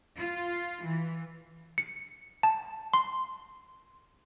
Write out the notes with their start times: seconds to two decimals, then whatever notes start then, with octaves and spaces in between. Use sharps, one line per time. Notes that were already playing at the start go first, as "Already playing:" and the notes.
0.17 F4
0.84 E3
1.78 C#7
2.43 A5
2.94 C6